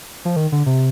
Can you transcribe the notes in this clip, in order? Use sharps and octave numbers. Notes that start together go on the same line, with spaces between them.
F3
D#3
D3
C3